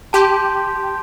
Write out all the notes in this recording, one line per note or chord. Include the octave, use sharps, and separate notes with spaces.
G4 A5 C6 G6